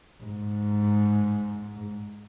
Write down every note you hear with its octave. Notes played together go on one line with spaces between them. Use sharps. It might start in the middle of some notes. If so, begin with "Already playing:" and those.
G#2